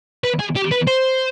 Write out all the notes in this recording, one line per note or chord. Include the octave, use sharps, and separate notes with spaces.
B4
G#4
G4
B4
C5